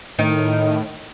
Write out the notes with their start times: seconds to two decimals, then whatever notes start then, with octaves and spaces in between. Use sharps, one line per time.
0.19 A2 D#3